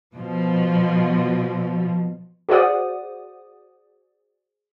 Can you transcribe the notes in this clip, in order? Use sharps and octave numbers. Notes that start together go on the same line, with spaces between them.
B2 F3
F#4 G#4 C5 D5 F#5 D#6